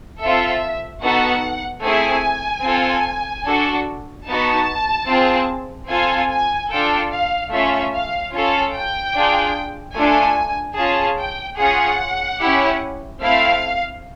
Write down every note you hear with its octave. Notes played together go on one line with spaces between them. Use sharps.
C4 F4 A4 E5
B3 D#4 F#4 A4 F#5
A3 C4 E4 G#4 G#5
C4 F4 A4
D4 F#4 A4
B3 D#4 F#4 A5
C4 F4 G#4
C4 F4 A4 G#5
G#5
D4 F4 A4 G5
F5
A3 C#4 F4 E5
F5
C#4 F4 A4
G5
D4 F4 G#4
A3 D4 F4 A4 G#5
C#4 F4 G#4 A5
G5
C#4 F4 G#4 F#5
C#4 E4 G4
A3 C4 E4 F5